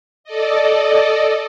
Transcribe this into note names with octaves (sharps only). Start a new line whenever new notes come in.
A4 D5 D#5